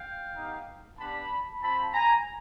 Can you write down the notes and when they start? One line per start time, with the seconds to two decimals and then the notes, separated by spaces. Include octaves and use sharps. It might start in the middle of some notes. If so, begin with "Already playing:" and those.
Already playing: F5 G5
0.36 B3 D#4 G4
0.98 G3 B3 D4 A5 B5
1.61 C4 F4 A5 B5
1.93 G#5 A#5